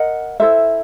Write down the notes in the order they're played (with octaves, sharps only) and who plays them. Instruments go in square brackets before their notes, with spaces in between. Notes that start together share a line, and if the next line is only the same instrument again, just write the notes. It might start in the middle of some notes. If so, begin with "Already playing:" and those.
Already playing: [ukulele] A#4 D#5 F#5
E4 A4 C5 E5